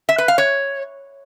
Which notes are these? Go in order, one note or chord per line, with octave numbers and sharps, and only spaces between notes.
E5
B4
F5
C#5